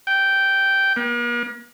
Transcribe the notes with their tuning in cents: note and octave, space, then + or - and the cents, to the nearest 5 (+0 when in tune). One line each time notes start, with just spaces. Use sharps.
G5 -10
A#3 +45